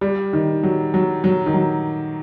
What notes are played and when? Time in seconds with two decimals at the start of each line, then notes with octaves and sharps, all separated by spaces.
0.01 G3
0.33 D#3
0.63 F#3
0.94 F#3
1.24 F#3
1.46 D#3
1.54 F#3